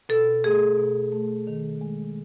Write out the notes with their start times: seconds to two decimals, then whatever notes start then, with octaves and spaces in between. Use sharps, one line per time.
0.09 B2 A4
0.44 A3 G#4
0.78 B2
1.12 A3
1.47 D#3
1.81 G#3